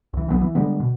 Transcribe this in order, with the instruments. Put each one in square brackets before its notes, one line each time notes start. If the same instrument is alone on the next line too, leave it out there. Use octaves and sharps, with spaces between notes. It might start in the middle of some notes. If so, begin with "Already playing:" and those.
[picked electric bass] C#2 E3
B1 F#3 G3 B3
E3
D3 G3 G#3 B3
B2